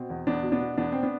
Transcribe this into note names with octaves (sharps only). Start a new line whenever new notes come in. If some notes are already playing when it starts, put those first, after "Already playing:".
Already playing: B2 C4
E2
E2 B3 D4
B2
B3 D4
B2
E2 B3 D4
C4
B3 D4